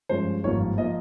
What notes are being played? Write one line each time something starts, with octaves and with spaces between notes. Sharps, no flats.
G2 F3 G#3 C#4 C5
G#1 G2 F3 A#3 C#5
F3 A#3 D#5